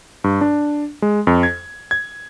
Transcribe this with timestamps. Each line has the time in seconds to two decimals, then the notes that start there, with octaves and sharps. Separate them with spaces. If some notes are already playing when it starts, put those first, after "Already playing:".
0.24 G2
0.41 D4
1.02 G#3
1.27 F2
1.43 G#6
1.91 G#6